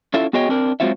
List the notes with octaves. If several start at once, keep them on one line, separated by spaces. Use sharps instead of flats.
C#4 E4 F4 A4 E5
B3 F#4 G#4 C#5 D#5 G5
C4 D4 A#4
F#3 G#3 C4 F4 F#4 E5